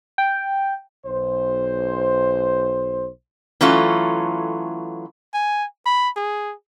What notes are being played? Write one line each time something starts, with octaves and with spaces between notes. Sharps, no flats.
G5
B1 C5
E3 F#3 A3 C#4 F4 A4
G#5
B5
G#4